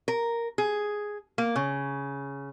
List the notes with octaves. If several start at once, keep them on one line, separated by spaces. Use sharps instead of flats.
A#4
G#4
A#3
C#3